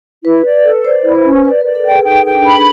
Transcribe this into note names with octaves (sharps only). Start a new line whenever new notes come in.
E4 B4
D5
A4
C5 D5
E4
C5
C#4
B4 D5
A#4 D5
A4
G5
G#4
D#4 G5
G5
D4
B5